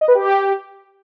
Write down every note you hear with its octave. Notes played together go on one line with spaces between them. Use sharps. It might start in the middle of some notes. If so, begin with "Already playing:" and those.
D#5
B4
G4